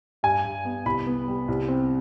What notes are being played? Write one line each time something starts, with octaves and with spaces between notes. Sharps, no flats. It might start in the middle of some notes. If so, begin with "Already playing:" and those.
G2 G#5
G2
B3
C2 B5
B3
G3
C2
C4